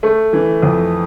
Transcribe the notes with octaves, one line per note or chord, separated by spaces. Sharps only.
A3
E3
F2